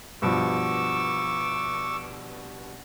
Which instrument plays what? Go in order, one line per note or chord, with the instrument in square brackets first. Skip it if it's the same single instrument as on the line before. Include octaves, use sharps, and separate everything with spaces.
[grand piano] G2 B2 F3 [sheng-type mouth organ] C#6 D6 E6